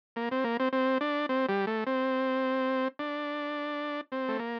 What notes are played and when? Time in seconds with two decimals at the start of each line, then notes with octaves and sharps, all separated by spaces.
0.16 A#3
0.31 C4
0.44 A#3
0.60 C4
0.73 C4
1.01 D4
1.29 C4
1.49 G3
1.67 A3
1.87 C4
2.99 D4
4.12 C4
4.28 A3
4.39 A#3